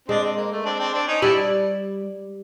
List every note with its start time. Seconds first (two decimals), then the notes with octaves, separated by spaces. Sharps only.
0.09 G#3 C4 D4
0.24 C4
0.37 A#3
0.52 A3
0.65 C4 D4
0.79 C4 D4
0.93 C4 D4
1.07 C#4 D#4
1.22 G3 D4 E4